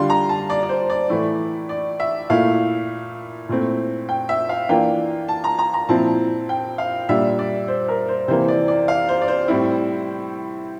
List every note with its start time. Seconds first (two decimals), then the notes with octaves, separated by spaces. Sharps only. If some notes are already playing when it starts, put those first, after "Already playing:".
Already playing: D3 G3 D4 F4 C6
0.10 A#5
0.29 A5
0.50 D5
0.63 D5
0.69 C5
0.90 D5
1.09 A2 E3 A3 E4
1.69 D5
2.00 E5
2.30 A#2 A3 E4 F5
3.49 A#2 A3 C4 E4
4.09 G5
4.29 E5
4.49 F5
4.69 E3 A#3 D4 F4 G5
5.28 A5
5.44 A#5
5.59 A#5
5.74 A#5
5.89 A#2 F3 C4 E4 A5
6.49 G5
6.78 F5
7.09 A#2 G3 D4 E5
7.39 D5
7.68 C5
7.88 A#4
8.08 C5
8.28 C3 E3 A#3 C5
8.48 D5
8.68 D5
8.88 F5
9.09 C5
9.21 D5
9.28 C5
9.48 A2 G3 C4 E4